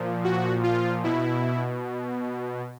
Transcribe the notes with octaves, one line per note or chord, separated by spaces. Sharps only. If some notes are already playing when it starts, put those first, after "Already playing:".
Already playing: A#2 F3
F#4
F4
B2 E4